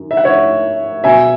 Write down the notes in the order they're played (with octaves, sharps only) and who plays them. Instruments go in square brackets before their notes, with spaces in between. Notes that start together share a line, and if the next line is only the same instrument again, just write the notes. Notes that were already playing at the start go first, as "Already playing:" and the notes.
Already playing: [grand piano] F#2 D#3
E5
F#5
C#5 E5
B2 F#3 E5 G#5